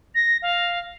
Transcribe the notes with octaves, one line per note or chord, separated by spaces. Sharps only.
A#6
F5